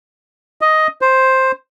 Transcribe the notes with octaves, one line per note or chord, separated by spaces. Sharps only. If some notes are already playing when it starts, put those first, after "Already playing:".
D#5
C5